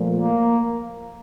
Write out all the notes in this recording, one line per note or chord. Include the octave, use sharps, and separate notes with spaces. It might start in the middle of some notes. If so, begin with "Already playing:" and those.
Already playing: A#2 F3 A3
A#3